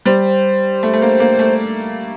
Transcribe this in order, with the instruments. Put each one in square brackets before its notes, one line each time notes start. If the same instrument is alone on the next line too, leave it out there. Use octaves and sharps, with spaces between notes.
[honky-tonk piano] G3 [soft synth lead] C5
[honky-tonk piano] A3
A3
A#3
A#3
A3